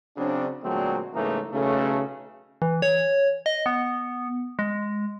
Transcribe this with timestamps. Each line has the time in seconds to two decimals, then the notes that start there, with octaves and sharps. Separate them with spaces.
0.17 C#3 F#3 C4 D4
0.64 A#2 D3 F#3 G#3 A3 C4
1.14 G#2 C#3 E3 A3 A#3 D#4
1.53 B1 C#3 A3
2.62 E3
2.82 C#5
3.46 D#5
3.66 B3
4.59 G#3